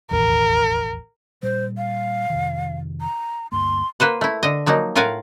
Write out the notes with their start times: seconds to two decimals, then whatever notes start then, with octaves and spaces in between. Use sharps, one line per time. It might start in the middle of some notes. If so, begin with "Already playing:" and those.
0.11 E1 A1 D#2 A#4
1.43 A#2 G3 C5
1.77 F5
2.30 F2 C3 D#3
3.01 A#5
3.52 D2 G2 A#3 C6
4.00 A#3 B4 C5 F#5
4.21 A3 E4
4.43 D3 D#5
4.66 F3 F#3 A#3 D#4
4.95 A2 F4 A#4 F5 F#5 G#5